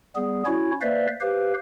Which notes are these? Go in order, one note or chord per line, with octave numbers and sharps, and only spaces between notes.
G3 B3 G#4
C#4 E4 F#4 C#5
A#3 B4 C5 D5 E5 F5
G4 B4 C5 F5